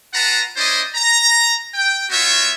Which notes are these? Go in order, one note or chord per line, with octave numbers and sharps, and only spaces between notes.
F4 B4 F#5 A5 A#5
C#4 E4 C5 D5 D#5
A#5
G5
B3 F4 F#4 C#5 E5